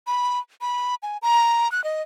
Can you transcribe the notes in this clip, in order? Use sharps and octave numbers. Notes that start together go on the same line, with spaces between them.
B5
B5
G#5
A#5
F#6
D#5